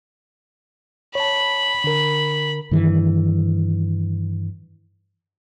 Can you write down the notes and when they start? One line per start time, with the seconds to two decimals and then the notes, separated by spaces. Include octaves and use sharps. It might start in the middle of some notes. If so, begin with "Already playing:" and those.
1.15 C#5 A5 B5
1.84 D3 A#4
2.71 G2 D#3 E3